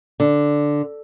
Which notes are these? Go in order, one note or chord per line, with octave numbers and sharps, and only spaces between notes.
D3